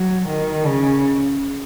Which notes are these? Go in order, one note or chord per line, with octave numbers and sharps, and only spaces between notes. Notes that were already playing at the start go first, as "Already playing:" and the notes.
Already playing: F#3
D#3
C#3